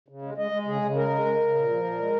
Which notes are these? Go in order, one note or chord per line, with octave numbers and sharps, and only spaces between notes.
C#3
G#3
G#3 D#5
G#3
C#3 G#4
C#3
G#3 A#4
G#3
C#3
C#3
A#2
F3
A#2
G#3